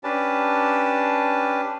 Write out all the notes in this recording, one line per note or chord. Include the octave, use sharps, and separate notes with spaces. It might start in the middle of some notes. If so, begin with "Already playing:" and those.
C#4 D4 G4 B4 A5